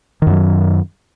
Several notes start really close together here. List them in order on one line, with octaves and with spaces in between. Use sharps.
D#3 F#2 F#3